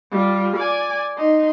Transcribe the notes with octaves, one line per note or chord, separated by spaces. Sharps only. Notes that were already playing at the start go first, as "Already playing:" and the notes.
G3 F4
D5 G#5
D#4 C6